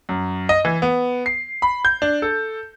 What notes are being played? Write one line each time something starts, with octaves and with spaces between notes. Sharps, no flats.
F#2
D#5
E3
B3
C7
B5
G6
D4
A4